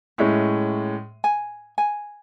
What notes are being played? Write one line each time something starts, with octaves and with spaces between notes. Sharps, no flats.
A2 G#3 C#4 E5
G#5
G#5